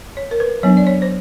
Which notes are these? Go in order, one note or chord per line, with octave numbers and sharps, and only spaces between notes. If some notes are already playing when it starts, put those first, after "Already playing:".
C#5
A#4
B4
F#3 B3 D4 C#5
D5
C#5
C5